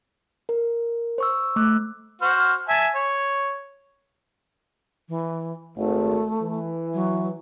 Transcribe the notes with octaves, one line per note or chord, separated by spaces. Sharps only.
A#4
C5 C#6 E6
A3 D6 E6 F#6
F#4 C5 F6
E5 G#5 A5
C#5
E3
G#1 A3
E3
F#3